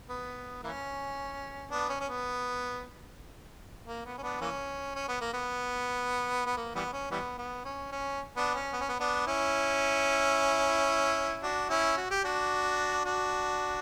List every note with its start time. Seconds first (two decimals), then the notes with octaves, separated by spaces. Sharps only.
0.10 B3
0.64 E3 A#3 C#4
1.71 B3 D4
1.89 C#4
2.01 C#4
2.08 B3
3.87 A#3
4.05 B3
4.18 C#4
4.23 B3 D4
4.41 E3 A#3 C#4
4.95 C#4
5.08 B3
5.21 A#3
5.34 B3
6.46 B3
6.57 A#3
6.75 E3 G3 B3
6.93 C#4
7.11 E3 G3 B3
7.38 B3
7.65 C#4
7.92 C#4
8.37 B3 D4
8.55 C#4
8.73 B3
8.80 C#4
8.89 B3
9.00 B3 D4
9.27 C#4 E4
11.43 D4 F#4
11.70 C#4 E4
11.97 F#4
12.11 G4
12.24 D4 F#4
13.05 D4 F#4